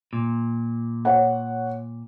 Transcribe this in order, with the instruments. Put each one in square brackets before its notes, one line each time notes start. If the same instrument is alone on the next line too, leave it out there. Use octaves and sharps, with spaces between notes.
[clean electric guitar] A#2
[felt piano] C#5 F#5